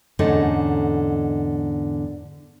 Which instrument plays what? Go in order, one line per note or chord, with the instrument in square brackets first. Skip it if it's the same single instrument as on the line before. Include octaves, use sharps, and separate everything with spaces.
[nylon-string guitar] E2 G#2 D3 A3 C#4 D#4